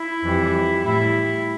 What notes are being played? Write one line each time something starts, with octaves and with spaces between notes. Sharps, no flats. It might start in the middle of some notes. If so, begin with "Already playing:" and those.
Already playing: E4
F2 E3 G3
A2 G3 E4